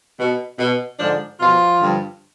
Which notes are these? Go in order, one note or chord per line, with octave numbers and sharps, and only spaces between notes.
B2
B2
G#2 D3 F3 D4
B2 F3 F4
G2 D3 F3